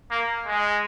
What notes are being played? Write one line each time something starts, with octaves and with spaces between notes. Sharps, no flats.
A#3
G#3